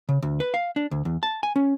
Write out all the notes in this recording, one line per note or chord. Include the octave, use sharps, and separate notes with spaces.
C#3
D2
B4
F5
D4
D2
E2
A5
G#5
C#4